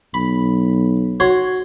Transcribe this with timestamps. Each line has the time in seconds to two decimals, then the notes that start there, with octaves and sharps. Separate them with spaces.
0.14 B1 B5
1.20 F#4 C#5 C6